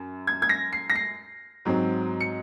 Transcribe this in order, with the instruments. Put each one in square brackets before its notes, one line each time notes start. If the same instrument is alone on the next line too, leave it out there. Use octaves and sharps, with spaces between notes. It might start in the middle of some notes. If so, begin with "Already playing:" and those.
Already playing: [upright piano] F#2
G#6
G#6
A#6
C7
A#6
C7
G#2 F#3 C4
C#7